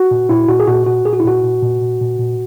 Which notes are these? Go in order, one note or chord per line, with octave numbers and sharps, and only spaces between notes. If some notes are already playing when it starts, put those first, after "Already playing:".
Already playing: F#4
A#2
A#2 E4
A#2 F#4
G#4
A#2 F#4
A#2 F#4
A#2 G#4
F#4
E4
A#2 F#4
A#2
A#2
A#2
A#2
A#2